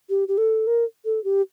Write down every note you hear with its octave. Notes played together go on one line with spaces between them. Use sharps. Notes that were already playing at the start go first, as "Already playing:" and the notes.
G4
G4
A4
A#4
A4
G4